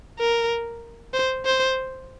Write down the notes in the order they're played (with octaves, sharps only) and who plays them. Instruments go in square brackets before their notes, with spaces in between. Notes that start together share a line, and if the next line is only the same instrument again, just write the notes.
[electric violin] A#4
C5
C5